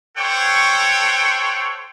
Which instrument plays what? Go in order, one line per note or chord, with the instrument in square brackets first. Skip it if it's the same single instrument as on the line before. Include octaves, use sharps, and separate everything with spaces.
[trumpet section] A4 C5 C#5 F#5 G5